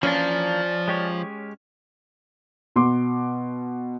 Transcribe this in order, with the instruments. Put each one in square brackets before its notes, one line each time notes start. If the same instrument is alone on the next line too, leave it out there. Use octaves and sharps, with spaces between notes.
[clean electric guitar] E3 A#3 D4 [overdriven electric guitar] F3 [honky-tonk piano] C#4 [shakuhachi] D5
[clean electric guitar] G#3 G4 C#5
[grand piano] B2 C6 D6